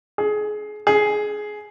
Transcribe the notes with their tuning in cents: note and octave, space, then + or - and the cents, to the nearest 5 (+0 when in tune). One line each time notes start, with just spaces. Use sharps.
G#4 +25
G#4 +15